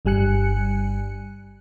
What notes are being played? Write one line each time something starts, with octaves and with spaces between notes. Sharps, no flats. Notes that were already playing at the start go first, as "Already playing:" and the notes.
G1 G2 G3 G#5 F#6 C#7